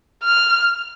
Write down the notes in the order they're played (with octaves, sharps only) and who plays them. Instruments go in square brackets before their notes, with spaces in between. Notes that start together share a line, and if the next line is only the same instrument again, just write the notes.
[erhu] F6